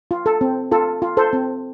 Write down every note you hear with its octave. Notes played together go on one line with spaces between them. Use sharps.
F4
A4
C4
F4 A4
F4
A4 C5
C4